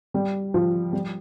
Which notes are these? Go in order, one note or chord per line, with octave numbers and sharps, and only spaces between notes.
G3
F3
G3